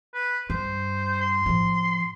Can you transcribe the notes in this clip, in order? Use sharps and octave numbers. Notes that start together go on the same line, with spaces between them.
B4
G2 C5
C6
A2 F3